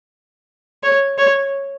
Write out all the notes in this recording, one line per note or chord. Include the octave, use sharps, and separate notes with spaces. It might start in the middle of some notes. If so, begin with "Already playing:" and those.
C#5
C#5